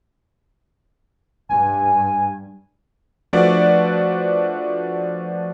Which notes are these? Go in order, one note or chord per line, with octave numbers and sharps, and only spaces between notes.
G2 G#5
F3 A3 D4 F#4 B4 D5